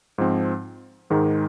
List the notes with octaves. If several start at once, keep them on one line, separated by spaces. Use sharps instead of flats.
G#2 F3 C4
G#2 D#3 G#3 D#4